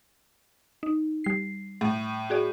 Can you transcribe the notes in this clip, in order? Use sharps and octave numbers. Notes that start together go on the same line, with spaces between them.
D#4
G3 C7
A2
F#4 G#4 D5